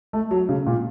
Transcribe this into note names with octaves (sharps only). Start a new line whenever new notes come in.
A3
F#3
C#3
A#2